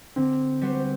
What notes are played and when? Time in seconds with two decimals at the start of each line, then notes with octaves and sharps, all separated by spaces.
0.16 D3 C4
0.62 G3 B3 F#4 C5